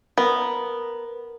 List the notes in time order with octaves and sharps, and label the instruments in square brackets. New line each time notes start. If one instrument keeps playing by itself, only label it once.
[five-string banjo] B3 [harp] A#4